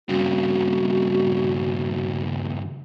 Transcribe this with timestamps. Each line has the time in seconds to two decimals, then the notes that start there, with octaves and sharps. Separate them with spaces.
0.09 G2 C#3 F#4